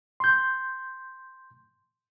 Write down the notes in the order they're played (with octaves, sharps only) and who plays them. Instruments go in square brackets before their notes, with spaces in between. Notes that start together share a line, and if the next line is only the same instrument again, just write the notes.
[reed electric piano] C6 G6